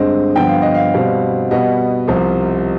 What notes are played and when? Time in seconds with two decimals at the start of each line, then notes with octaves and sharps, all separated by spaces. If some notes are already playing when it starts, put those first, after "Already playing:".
Already playing: G2 D3 G#3 C4 D#5
0.35 G2 D3 F3 B3 G5
0.49 F5
0.62 D#5
0.74 F5
0.94 B2 G3 C4
1.51 B2 G3 B3 D#5
2.08 C2 C3 F3